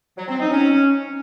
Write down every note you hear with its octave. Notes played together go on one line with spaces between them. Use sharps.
F#3
C4
D#4
C#4